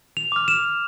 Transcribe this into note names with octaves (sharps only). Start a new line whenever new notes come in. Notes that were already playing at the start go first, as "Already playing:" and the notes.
F7
D6 F6
E7